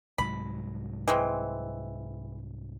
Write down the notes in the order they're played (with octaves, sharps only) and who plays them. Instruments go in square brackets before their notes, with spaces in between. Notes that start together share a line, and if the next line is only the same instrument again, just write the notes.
[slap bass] C2 G#2 F#3 [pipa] B5
[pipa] E3 G#3 C4